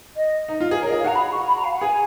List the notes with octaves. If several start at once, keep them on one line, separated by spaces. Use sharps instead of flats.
D#5
D#4
F4
G#4
A#4 C#5
D#5
G#4
F5
F#4 A#5
B5
C#6
B5
A#5
F5
F#5
G#4 G#5